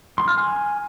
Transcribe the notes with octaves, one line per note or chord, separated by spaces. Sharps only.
C6
F6
G#5